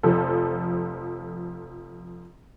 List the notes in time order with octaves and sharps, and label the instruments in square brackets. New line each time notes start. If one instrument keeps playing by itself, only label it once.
[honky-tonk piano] F1 F3 A4